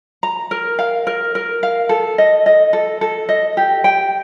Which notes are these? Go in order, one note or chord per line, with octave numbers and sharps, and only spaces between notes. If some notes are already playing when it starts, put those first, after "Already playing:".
A#5
A#4
F5
A#4
A#4
F5
A4
D#5
D#5
A4
A4
D#5
G4
G5